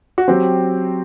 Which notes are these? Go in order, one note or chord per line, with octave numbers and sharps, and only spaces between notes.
F#4
F#3 C4 G4